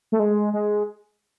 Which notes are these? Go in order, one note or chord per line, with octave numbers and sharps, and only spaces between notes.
A3
G#3
G#3